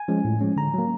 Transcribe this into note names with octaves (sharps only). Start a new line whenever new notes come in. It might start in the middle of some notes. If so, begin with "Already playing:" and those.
Already playing: G#5
F3 G#3 C#4
A2
F3 G#3 C#4
D3 A#5
F#3 A#3